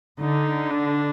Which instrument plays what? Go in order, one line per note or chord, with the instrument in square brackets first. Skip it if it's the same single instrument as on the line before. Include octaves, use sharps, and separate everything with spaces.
[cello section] D3 [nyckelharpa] D#4
[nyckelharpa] D4